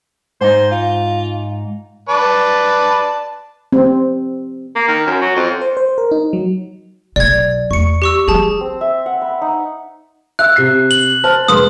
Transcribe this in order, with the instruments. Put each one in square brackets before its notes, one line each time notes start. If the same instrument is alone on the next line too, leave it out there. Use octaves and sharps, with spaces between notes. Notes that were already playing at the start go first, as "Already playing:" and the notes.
[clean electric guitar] G#2 D#4 [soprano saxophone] C5
[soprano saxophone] F4
[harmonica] B4 D5 A5
[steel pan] C4
[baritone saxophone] A#3
D#3
F#2
F#3
F2
[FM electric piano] C5
C5
A#4
D#4
F#3
[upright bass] B1 [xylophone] D5 G#6
[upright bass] E2 A3 [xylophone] C#6 C#7
[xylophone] G4 C#6 E6
[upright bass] F3 G3 [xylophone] G#4 A5
[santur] C4
E5
F#5
B5
D#4
[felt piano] E5 E6 [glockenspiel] F#6
[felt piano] C3 C7
[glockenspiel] F#7
[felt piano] C5 A5 F6
[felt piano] E1 B4 C6 [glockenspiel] D#6